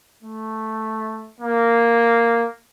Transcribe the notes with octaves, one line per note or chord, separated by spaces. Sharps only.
A3
A#3